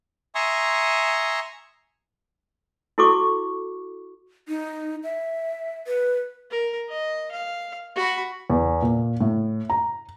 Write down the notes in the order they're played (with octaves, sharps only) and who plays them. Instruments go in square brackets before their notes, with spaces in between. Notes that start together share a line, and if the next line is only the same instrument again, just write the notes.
[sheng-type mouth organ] E5 G#5 A#5 C6 C#6 D#6
[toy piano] E4 F#4 A4 C#6 D6
[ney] D#4
E5
B4
[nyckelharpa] A#4
D#5
F5
F#4 B5
[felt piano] E2
A#2
A2
A#5